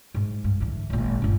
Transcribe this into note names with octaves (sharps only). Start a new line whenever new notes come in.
G#2 F#3
G2
D3 E3
G#1 A#2
G1 D4